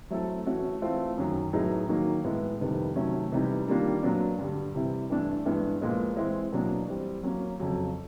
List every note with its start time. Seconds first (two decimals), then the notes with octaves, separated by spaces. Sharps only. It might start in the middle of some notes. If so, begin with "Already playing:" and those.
0.10 F#3 A3 C4 E4 A4
0.46 E3 A3 C#4 F#4
0.82 E3 A3 C4 F4
1.17 F#2 D#3 F#3
1.53 A2 F#3 B3 D#4 G#4
1.89 D#3 F#3 A#3 D#4
2.25 A2 E3 G#3 B3
2.60 F2 C3 D#3 G3 B3
2.96 C3 D#3 F#3 A3 C#4
3.32 C3 E3 G3 B3 D#4
3.67 D#3 G3 A#3 D4 F4
4.03 A#2 F#3 B3 D4
4.38 G2 D3 G3
4.74 C3 E3 G3 C4 E4
5.10 G2 E3 A3 D4
5.45 G2 E3 G#3 B3 E4
5.81 A#2 F3 G#3 B3
6.16 E3 G#3 C4 E4
6.53 B2 F#3 A#3 D4
6.88 E3 G3 C4
7.23 F#3 A#3 C#4
7.59 F2 C#3 F#3